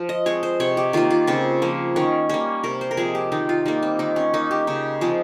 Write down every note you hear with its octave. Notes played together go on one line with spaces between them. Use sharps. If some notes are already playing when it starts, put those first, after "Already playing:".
Already playing: F3
D#5
G#3 C4 C#5
C5
C3 C#5
G4
D#3 A#3 F4
F4
C#3 C4
F3 A#3
D#3 C#4
G3 A#3 C#4
C3 A#4
C5
A#4
F3 G#3 C4 G#4
G4
D#3 D#4
F4
G3 A#3 D#4
C4
D#3 D#4
C#4
A#3 D#4
G4
C#3 D#4
F3 G#3 C4